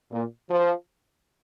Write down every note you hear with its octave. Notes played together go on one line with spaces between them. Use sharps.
A#2
F3